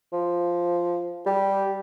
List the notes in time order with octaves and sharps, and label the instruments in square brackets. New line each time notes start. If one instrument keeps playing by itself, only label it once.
[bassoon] F3
[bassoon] G3 [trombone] G4